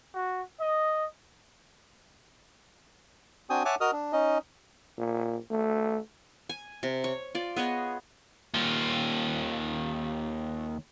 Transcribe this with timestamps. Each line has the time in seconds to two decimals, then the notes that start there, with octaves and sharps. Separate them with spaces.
0.14 F#4
0.60 D#5
3.50 C4 D4 F#4 G5 G#5 D#6
3.65 C#5 E5 F#5 G#5 A5 D6
3.81 F#4 A#4 D#5 D#6 F6
3.93 D4
4.13 C#4 D#4 D#5
4.98 A#2
5.51 A3
6.49 G#5
6.83 C3
7.04 C#5
7.35 F4 D5
7.56 B3 G#4 C#5 D#5
8.54 D#2 F4